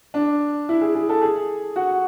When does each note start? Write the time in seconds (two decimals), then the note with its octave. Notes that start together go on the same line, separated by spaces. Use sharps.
0.14 D4
0.69 E4
0.82 G#4
0.95 G#4
1.09 A4
1.22 G#4
1.76 F#4